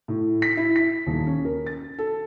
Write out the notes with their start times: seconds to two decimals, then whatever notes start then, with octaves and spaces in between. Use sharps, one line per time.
0.08 A2
0.42 B6
0.57 E4
0.76 B6
1.07 D#1
1.26 C#4
1.45 A#4
1.66 A6
1.98 A4